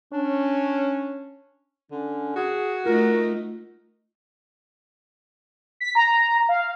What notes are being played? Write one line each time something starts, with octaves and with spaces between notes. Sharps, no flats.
C#4 D4
D3 C#4
F#4 G#4
A3 D#4 F4 A#4
B6
A#5
F5